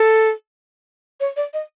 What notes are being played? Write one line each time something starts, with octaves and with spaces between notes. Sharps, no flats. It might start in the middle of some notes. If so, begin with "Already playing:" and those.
Already playing: A4
C#5
D5
D#5